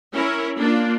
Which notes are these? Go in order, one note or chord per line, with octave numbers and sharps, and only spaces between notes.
C#4 E4 A#4
A#3 D4 F4